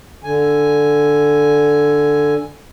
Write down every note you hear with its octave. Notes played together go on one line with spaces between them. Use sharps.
D3 G#5